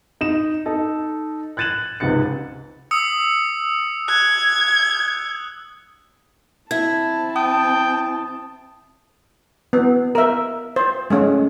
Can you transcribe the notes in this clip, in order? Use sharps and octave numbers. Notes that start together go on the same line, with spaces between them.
D#4 E7
D#4 A4
F#6 G#6 A6 D#7 E7 F#7
C#2 G#2 C3 A6 C#7
D#6 E6 C#7
F#6 G#6
C4 E4 A5 G#6
G5 D#6
B3
A#4 E5
C5
G#3 A3 C#4